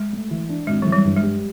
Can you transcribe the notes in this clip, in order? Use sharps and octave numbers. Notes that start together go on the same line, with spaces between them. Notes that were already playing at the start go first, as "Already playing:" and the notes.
Already playing: G#3
A3
E3
D4
G#1 G#3
E3 F#3
G3
G2
G#3
G3